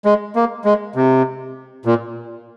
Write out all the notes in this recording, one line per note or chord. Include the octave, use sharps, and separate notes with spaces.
G#3
A#3
G#3
C3
A#2